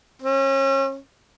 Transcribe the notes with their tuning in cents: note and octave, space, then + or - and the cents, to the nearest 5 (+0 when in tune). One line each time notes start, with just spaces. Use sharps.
C#4 -35